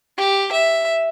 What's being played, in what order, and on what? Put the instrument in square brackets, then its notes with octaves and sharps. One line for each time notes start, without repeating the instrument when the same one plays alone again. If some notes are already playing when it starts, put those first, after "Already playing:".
[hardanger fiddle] G4
E5